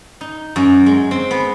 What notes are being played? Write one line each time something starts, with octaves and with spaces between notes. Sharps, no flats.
D#4
F#2
G#3
C4
B3